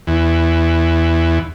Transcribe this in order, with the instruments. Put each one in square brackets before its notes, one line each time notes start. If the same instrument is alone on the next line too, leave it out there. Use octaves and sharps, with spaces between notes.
[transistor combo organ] E2